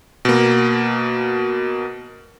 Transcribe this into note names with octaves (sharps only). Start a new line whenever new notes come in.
B2 A#3